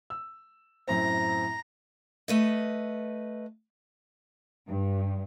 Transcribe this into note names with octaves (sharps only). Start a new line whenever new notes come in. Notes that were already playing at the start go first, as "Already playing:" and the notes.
E6
F#2 A2 C4 A#5
A3 B4 D#5
G2